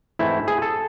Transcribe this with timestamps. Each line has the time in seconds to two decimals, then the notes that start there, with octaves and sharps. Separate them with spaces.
0.19 G#2 E3 A3 C4 E4
0.48 G#4
0.62 A4